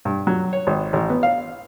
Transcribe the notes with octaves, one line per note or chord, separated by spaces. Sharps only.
G2
F#3
C#5
G#1
A1
B3
F5